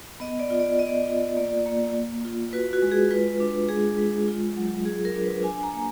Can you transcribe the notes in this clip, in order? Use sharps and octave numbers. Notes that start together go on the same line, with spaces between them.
B3 D#5
D5
F4
D5
B3 D#5
D5
D#5
F4
A#3 D5
A#3
A#3
F4
F#4 B4
F#4
G#3
G#4
F4 B4
D4
G#3 G#4
G#3
F4
F#3
F#3 G#4
A#4
D4
B4
D4 G#5
A#5
A#3